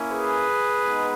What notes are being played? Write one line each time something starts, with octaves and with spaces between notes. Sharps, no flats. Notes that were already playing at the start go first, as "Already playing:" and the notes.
Already playing: A#3 C#4 E4
G#4 B4
G#3 B3 D#4